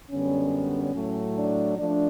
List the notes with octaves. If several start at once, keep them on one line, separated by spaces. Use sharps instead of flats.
F#2 D3 G3 B3 C#4
A2 F#3 A3
D4
F3 A3 D4